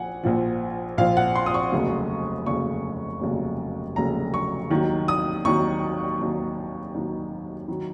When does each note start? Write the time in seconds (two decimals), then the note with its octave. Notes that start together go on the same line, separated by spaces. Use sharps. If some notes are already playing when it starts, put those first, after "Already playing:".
Already playing: A#1 F3 F#5 G#5
0.23 A#1 A#2 F3
0.98 A#1 A#2 F3 F5
1.17 F#5
1.36 C6
1.46 D#6
1.54 C#6
1.72 F1 D#2 C#3 F#3
2.46 F1 D#2 C#3 F#3 C#6
3.21 F1 D#2 C#3 F#3
3.96 F1 D#2 C#3 F#3 A#5
4.34 C#6
4.71 D#2 D#3 F#3
5.08 D#6
5.45 D#2 D#3 F#3 C#6
6.19 D#2 D#3 F#3
6.95 D#2 D#3 F#3
7.68 D#3 F#3